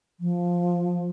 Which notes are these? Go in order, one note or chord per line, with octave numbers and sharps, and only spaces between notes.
F3